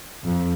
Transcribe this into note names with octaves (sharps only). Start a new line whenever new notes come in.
F2